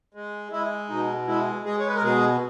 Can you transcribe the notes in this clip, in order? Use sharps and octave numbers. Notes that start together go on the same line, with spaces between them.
G#3
G#3 E4
B2 D#4
G#3 E4
G#3 G#4
C#5
B4
A#4
B2 G#4